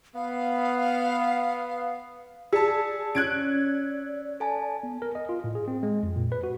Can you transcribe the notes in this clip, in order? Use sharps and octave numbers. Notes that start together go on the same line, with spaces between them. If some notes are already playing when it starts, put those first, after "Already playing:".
B3 F5
G#4 D5 A5 E6 B6 C#7
C#4 F#6 G#6 D7
A4 G#5 A5
B3
A#4
D#5
F4
A2
G#4
C4
G#3
F2
A#2
B4
F#4